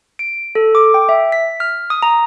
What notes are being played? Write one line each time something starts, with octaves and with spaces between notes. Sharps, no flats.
D7
A4
D6
G5
E5
B6
F6
D#6
A#5